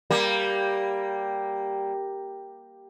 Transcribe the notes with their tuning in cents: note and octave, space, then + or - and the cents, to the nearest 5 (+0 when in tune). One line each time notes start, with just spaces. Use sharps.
G3 +0 A#3 +0